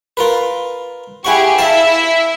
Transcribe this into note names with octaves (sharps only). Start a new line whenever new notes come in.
F4 A#4 B4
E4 G4 G#4 F#5 C#6
E4 E5 F5 A5